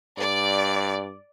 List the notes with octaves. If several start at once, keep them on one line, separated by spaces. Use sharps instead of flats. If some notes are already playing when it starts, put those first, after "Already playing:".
G2 D5